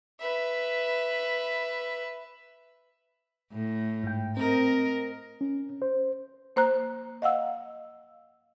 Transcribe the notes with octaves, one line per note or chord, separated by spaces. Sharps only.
B4 E5
A2
G#2 G5
C4 A#4 D#5
C#4
C5
A#3 C5 A#5 F#6
D#5 F5 F#5 E6